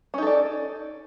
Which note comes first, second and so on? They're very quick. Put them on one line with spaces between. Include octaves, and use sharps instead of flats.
C#4 D#4 A4 D5